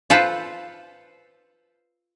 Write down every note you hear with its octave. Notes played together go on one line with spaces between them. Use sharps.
F4 A4 B4 C5